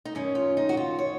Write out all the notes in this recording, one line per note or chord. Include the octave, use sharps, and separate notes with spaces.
D#4
F#2 D#3 C#4
F4
D#4
F#4
F4
C#5